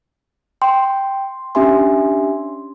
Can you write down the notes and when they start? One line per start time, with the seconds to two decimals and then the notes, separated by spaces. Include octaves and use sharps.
0.62 G5 C6
1.55 C#4 D4 G4 E5 G#5 C6